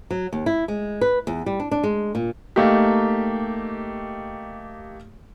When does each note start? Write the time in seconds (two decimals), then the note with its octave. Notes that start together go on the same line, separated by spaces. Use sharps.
0.11 F#3
0.33 D#2
0.46 E4
0.68 G#3
1.01 B4
1.27 E2
1.46 G3
1.60 D4
1.71 D4
1.84 G#3
2.15 A#2
2.56 A3 A#3 D#4 G4